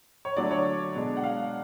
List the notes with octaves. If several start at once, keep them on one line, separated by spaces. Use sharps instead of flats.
C#5
D3 F#3 A3 D4 D5
C#5
B2 G#3 D4
F#5
F5